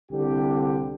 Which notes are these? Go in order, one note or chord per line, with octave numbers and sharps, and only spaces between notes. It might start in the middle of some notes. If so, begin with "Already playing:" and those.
C2 D3 G4